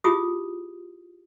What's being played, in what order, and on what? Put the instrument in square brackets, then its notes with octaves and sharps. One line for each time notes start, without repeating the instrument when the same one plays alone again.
[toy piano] E4 F4 G4 G#4 D#6